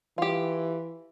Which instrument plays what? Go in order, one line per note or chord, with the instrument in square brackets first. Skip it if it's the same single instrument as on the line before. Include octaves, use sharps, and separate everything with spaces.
[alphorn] E3 [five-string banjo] F4 G4